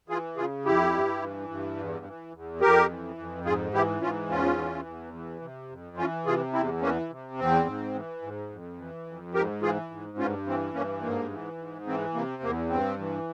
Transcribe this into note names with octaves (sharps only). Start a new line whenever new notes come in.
E3 F4 G#4
C#3 F4 G#4
F2 E4 G4
G2
E3
G2
E2
E3
E2
F2 G4 A#4
E3
F2
G#2 F4 G#4
E3 E4 G4
G#2 C#4 F4
E2 C#4 F4
E3
E2
E3
C3
F2
E3 C#4 F4
C3 F4 G#4
E2 C4 E4
E3 A#3 C#4
C3
E2 C4
G#2
E3
G#2
F2
E3
F2
G#2 G4 A#4
E3 F4 G#4
G#2
G2 C#4 F4
E3 C4
G2 A#3 C#4
G#2 A#3
E3
G#2
E3 C4
C3 A#3
E2 A#3
G2 C4
E3